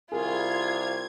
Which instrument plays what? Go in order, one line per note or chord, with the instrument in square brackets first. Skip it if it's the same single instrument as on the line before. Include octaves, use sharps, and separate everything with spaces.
[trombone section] C2 [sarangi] F4 [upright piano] G#4 A#4 [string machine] G#6